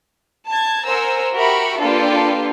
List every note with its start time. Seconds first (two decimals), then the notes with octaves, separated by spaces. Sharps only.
0.48 A5 G#6
0.84 A#4 C5 F#5 G#5 A#5 E6
1.34 F#4 G4 A#4 E5 B5 C#6
1.80 A#3 D4 F4 G4 A4 B4